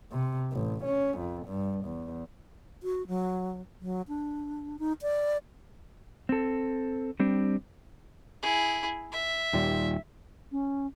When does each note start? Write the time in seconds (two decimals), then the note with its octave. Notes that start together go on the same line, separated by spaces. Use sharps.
0.11 C3
0.53 A1
0.84 C#4
1.18 F2
1.46 G2
1.85 E2
2.83 F#4
3.08 F#3
3.81 F#3
4.08 D4
4.79 D#4
5.02 D5
6.29 C4 A4
7.20 G3 C4 D4
8.43 E4 G#4
9.12 E5
9.53 D#2 A#2 G3
10.52 C#4